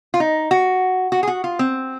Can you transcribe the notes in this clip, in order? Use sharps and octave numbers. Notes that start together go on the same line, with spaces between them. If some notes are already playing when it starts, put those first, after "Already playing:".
F4
D#4
F#4
F#4
G#4
F#4
F4
C4